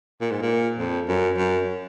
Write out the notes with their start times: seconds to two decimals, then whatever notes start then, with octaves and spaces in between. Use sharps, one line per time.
0.21 A#2
0.31 G#2
0.42 A#2
0.79 F2
1.08 F#2
1.37 F#2